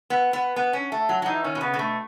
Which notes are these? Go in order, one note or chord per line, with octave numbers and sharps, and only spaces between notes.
B3
B3
B3
C#4
A3
F#3
F#3
E3 D#4
D#3 C#4
B2
C#3 B3
C#3
B2 A3